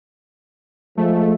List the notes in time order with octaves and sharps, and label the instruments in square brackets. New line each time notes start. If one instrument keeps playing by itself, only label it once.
[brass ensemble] F3 G#3 [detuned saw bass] A3